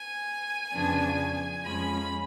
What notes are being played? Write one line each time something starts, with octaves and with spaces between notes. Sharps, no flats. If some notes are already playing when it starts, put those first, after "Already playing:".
Already playing: G#5
F2 C#3 F3 B3 D4
F2 F3 G#3 C#4 B5